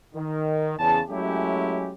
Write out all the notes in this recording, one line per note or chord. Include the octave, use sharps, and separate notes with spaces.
D#3
E2 C#3 A5
F#3 G#3 A3 C#4 E4 G4